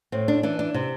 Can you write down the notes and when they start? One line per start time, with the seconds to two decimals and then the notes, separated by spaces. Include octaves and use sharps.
0.12 A2 C4
0.28 D4
0.43 E3 D4
0.59 D4
0.74 C3